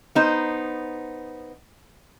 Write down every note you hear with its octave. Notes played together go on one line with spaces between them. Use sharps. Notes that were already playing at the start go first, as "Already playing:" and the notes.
B3 D#4 C5